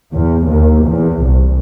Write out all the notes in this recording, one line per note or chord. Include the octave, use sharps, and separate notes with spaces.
E2
D#2
E2
C2